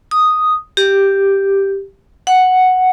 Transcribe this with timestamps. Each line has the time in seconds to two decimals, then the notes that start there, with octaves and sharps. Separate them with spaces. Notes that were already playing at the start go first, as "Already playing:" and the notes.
0.11 D#6
0.77 G4
2.27 F#5